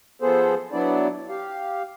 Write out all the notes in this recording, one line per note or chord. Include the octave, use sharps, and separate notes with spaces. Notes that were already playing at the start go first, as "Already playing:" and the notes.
F3 B3 G#4 A4 C5
F#3 B3 D4 E4 D5
G4 F5